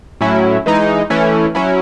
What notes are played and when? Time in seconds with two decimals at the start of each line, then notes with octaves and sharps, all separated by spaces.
0.21 A2 F#3 C#4 E4
0.66 E3 G#3 D#4
1.10 E3 A3 C#4 E4
1.55 F#3 C#4 E4